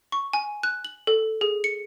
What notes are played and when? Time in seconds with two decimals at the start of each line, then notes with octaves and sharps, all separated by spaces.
0.12 C#6
0.33 G#5
0.63 F#6
0.85 F#7
1.07 A4
1.41 G#4
1.64 C#7